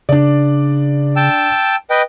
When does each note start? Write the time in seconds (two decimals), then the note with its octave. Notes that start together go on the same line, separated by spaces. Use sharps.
0.09 C#3 D4 D5
1.16 G5 A5 E6
1.90 B4 D#5 G5